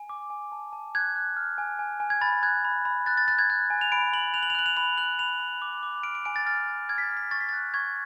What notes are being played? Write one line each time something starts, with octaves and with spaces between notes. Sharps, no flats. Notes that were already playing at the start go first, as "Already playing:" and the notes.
Already playing: G#5
D6
G#5
A5
A5
F#6 G#6
F#6
F6
G#5
G#5
G#5
G#6
B5 A6
F#6 G#6
B5
B5
F#6 A6
A6
F#6 A6
G#6
F#6
G#5
F7
B5 D7
B5 F#7
F#6 F7
F#7
F7
F#6 F#7
F7
B5 F7
F#6 F#7
B5 F7
B5
D6
D6
F6 D7
D7
G#5 D7
A6
F6 A6
F6
F6 G#6
B6
A6
F6
B6
C#6 A6
B6
A6
F#6
C#6 G#6